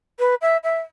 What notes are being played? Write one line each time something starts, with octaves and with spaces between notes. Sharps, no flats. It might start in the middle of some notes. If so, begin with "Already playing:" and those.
B4
E5
E5